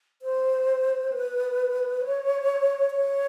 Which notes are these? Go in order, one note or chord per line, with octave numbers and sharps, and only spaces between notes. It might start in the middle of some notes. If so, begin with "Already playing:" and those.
C5
B4
C#5
C#5